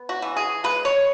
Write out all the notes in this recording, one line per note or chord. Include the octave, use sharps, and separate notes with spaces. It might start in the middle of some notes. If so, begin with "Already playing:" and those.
Already playing: B3
F#4
E3
G#4
G#3 B4
C#5